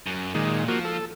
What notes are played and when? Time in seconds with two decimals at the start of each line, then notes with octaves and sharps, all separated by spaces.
0.07 F#2
0.35 A#2 D#3 G#3
0.68 F3 A#3 F#4
0.85 A4